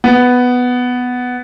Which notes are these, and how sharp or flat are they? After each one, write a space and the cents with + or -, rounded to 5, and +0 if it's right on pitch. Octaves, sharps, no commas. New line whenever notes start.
B3 +5